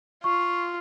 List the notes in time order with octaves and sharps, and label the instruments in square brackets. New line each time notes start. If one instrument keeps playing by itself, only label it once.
[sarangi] F4 [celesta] C#6